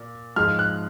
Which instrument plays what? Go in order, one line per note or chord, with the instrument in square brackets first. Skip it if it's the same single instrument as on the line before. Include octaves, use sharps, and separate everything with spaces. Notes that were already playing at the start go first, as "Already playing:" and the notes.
Already playing: [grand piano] A#2
G#2 F3 G#3 F6
F#6